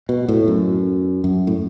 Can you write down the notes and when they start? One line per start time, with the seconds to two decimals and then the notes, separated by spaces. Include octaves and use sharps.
0.09 B2
0.28 A2
0.48 F#2
1.24 F#2
1.47 A2